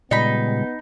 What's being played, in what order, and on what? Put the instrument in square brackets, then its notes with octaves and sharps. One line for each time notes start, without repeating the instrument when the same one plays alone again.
[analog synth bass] A#2 [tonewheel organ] C#3 G3 G#3 [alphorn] B3 [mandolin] D#4 B5